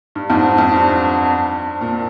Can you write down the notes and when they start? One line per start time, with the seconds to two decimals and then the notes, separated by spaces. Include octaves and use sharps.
0.15 G2
0.30 F2 G#2
0.58 F2
0.72 G2
1.81 A#2